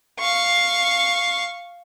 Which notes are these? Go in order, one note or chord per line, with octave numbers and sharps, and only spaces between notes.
F5 C#6